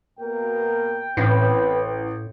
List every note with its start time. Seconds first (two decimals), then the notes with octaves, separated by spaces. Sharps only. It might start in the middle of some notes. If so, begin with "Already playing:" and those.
0.19 B2 A#3 A#4 G5
1.17 A1 A2 C4 B4